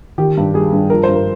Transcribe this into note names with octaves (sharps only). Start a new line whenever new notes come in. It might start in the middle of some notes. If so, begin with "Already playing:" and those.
D#3 G4
G2
G3 G#4
G2
F3 A#4
G2 C5
A#4